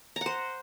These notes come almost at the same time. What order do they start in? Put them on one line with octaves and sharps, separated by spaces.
A#5 F#5 C5